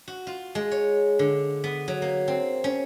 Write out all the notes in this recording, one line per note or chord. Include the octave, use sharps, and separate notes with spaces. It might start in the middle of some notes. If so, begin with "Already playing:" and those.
F#4
F4
G#3
C#5
D3
B3
F#3
A#3
C4
C#4